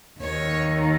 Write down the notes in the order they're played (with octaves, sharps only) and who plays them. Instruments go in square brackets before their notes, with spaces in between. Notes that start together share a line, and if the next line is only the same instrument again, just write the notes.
[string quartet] D#2 D#3 C#5